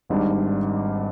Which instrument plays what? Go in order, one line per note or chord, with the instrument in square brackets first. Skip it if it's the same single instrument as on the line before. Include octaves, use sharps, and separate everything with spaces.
[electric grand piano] G#1 G#2 G3 D4